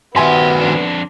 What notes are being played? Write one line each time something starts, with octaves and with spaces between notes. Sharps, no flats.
D#3 B3 F#4 G4 E5 G#5 C6
F2 D4